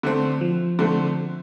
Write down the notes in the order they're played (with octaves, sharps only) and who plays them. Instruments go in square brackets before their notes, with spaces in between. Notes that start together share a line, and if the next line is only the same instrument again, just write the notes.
[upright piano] D3 A3 C4
[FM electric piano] F3
[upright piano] D3 A3 C4